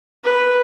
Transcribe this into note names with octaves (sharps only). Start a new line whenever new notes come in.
B4